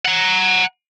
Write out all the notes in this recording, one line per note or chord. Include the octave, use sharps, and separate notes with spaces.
F#5 A#5